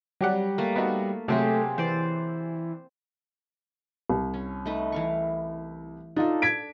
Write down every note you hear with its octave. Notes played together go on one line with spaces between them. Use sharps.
F#3 G3 G4 F#5
A3 A#3
B3 D#4 F#4
C3 F#3 A3 C4 G4 G#4
E3 C5 D5
C2
C#4
A3 D#4 B4
E3 F5 C#6
D4 D#4 F4 A4
G#6 B6 D7